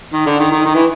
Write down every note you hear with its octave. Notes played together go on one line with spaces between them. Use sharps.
D#3
D3
D#3
D#3
D#3
E3